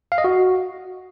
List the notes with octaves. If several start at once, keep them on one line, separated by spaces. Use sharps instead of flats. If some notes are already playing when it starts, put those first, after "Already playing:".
F5
D#5
F#4